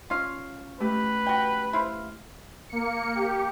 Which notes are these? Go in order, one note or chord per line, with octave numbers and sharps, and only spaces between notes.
C#4 F4 F5
A3 G4 B4
F#4 G5
E4 C5 F5
A#3 C#7
G4